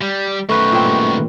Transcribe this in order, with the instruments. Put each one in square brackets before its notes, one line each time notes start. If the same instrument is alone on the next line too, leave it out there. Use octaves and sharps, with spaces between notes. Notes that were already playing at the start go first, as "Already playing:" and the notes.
[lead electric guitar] G3
[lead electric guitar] F#2 D#3 [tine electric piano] A3 B4 [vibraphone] C#6
[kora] A#2 C4
G2